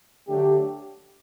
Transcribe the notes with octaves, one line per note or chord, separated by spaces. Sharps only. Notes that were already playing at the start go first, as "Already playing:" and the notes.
D3 F#3 A3 D4 G4